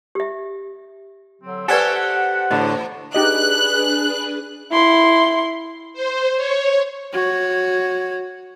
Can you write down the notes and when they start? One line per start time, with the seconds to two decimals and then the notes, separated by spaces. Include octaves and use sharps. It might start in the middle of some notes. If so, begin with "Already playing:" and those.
0.15 G4 E5
1.42 D3 F#3 C4
1.68 A3 C4 G4 A4 B4 D5 F#5 G#5
2.51 E2 A2 D3 D#5
3.15 D4 D#4 G4 G#4 B4 D#5 F#6
4.72 E4 C6
5.93 C5
6.36 C#5
7.13 F#4 C#5